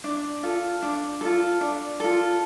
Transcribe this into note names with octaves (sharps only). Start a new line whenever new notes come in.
D4
F4 A4
D4
F4 A4
D4
F4 A4